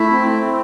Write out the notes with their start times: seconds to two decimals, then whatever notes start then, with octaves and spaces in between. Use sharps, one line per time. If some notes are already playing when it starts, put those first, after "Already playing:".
Already playing: A3 E4 E5
0.11 C4